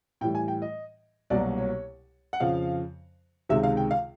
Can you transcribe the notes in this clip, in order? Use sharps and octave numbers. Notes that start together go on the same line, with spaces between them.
A2 E3 G3 G5
G#5
G5
D#5
C2 B2 F#3 A#3 D5
C#5
F#5
F2 C#3 F3 F5
C#2 C3 D#3 G#3 E5
F5
G5
F5